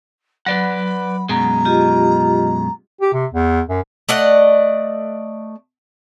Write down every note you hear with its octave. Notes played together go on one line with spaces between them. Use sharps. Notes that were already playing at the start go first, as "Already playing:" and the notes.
F#3 B4 D5 F#5 B5
F#2 B2 G#3 A#5
F4 G4 D#5
G4
C3
E2
F#2
A3 D5 D#5 F#5